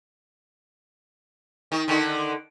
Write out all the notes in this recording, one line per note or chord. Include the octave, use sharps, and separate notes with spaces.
D#3
D3 D#3